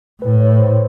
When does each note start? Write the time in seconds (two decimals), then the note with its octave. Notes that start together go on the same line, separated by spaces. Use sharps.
0.22 A2 B4
0.40 C#5
0.59 C5